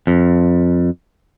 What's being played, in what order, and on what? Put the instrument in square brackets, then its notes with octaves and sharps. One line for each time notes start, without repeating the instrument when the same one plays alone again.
[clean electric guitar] F2